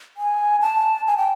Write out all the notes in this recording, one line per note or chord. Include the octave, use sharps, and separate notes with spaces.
G#5
A5
G#5
G5